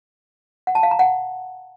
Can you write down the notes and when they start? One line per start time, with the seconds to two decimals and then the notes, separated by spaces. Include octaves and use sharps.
0.67 F#5
0.75 A5
0.83 F5
0.91 A#5
0.99 F#5